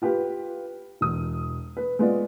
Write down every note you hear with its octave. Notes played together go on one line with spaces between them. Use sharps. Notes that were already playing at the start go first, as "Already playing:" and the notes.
F4 G4 B4
E1 D#6
B4
G#3 B3 F4 D5